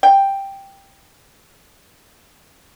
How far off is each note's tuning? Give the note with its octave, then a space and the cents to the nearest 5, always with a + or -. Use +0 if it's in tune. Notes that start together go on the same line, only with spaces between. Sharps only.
G5 +5